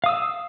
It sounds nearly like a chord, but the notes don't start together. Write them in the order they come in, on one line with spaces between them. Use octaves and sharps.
F5 D#6 E6